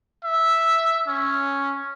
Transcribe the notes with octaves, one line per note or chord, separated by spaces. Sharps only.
E5
C#4